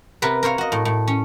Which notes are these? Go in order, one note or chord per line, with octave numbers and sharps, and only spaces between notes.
C3 B3 A#4 B4
A#4 C5 C#5 F5
F#4 D#5
A2
A2
C#4